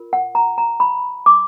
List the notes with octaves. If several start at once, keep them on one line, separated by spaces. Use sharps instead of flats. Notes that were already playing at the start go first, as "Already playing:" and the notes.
Already playing: F4 A#4
F#5
A#5
A#5
B5
D6